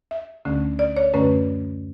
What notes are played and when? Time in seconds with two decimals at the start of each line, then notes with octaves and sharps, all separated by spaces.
0.11 E5
0.45 D2 D3 A3 C#4
0.79 D5
0.97 C#5
1.14 F#2 D3 A3 C#4 B4